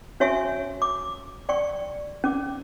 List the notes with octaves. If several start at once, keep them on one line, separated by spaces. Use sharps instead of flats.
C#4 F#4 C#5 E5 G#5 C#6
D6
D5 G5 C#6
C#4 D6